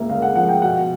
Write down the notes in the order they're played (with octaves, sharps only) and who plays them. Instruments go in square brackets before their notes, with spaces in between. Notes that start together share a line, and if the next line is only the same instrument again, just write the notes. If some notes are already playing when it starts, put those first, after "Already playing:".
Already playing: [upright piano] C#2 A#3 E5
C#3 F5
F#5
F3 F#5
G5
B2 F#5